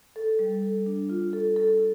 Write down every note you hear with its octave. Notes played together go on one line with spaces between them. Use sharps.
A4
G3
A4
D4
F4
A4
A4